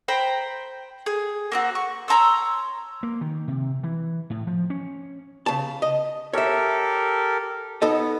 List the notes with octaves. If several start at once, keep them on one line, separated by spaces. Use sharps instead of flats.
C5 G5 A#5 B5
G#4
A#3 C4 F#4
C#6
C#5 A#5 C6 E6
A#3
D#3
C3
E3
A2
F3
C#4
C#3 A5
D#5
G4 A4 A#4 C#5 E5
B3 D#4 A4 D#5